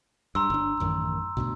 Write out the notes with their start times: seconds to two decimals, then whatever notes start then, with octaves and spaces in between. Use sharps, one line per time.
0.35 G2 A#5 C6 E6
0.50 G1 D4
0.80 A1 F#2 D#3
1.37 D2 G2 B2